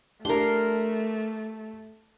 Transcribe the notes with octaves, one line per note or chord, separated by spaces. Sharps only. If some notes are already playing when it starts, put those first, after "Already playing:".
A3 D4 G4 A#4 C6